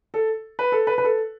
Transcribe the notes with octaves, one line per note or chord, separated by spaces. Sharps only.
A4
B4
A4
B4
B4
A4